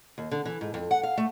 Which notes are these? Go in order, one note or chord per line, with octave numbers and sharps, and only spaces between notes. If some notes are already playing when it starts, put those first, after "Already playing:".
D#2
D3
E3
G#2
F2
F#5
F5
A3